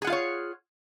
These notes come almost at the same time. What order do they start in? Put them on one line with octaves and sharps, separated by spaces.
G#4 F#5 F4 F5 C#5